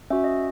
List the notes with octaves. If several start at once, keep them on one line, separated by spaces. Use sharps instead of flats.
C#4 F#4 E5
D#5